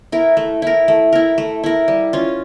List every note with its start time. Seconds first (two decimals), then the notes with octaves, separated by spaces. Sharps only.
0.12 E4 A#4
0.37 A3
0.62 E4 A#4
0.88 A3
1.13 E4 A#4
1.38 A3
1.63 E4 A#4
1.88 G3
2.13 C#4 F4